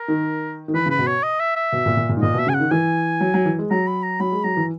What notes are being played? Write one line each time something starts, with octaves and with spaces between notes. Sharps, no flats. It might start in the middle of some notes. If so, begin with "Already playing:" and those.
Already playing: A#4
D#3
D#3
E3 B4
C#3 B4
B2
C#5
D#5
E5
E5
B2
A#2
A#2
A#2
G#2
A#2 D#5
B2 E5
C#3 G#5
F#5
D#3
E3 G#5
F#3
F#3
E3
G#3
F#3 A#5
B5
A#5
F#3 B5
G#3
F#3 A#5
E3